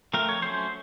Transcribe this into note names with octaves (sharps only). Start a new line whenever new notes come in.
F3 A3 C4 A#4
C#5
F#3 A3 C#4 C5